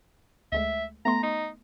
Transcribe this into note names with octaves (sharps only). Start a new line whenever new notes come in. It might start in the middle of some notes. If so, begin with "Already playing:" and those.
D2 G#3 A3 E5
A3 B3 A#5 C6
D#4